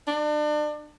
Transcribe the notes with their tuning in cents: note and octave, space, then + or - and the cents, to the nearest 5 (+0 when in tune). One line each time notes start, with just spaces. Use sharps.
D4 +35